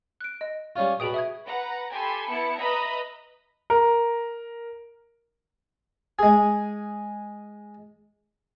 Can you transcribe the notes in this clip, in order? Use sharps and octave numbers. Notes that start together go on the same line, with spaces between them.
F#6 D7
D#5
G3 C#4 F4
B2 G#4 G5 B5 D#6
E5 D#6 G#6
B4 F#5 A#5
G4 A4 G#5 B5 C6
B3 E4 A5 C#7
B4 D#5 E5 A#5 B5
A#4
G#3 G#4